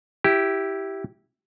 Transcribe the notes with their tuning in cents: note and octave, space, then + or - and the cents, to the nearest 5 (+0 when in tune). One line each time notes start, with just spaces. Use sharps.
E4 +0 G4 -10